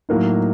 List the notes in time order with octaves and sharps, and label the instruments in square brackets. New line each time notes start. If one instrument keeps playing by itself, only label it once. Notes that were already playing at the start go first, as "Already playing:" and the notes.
[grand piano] A2 F#3 A#3 D#4